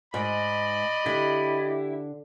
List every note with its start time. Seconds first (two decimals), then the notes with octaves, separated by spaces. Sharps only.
0.14 G#2 D5 D#5 B5
1.06 D3 E4 G4